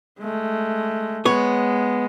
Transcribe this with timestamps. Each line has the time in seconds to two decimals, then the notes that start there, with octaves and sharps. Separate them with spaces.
0.20 G#3 A3
1.25 G#3 B3 C#5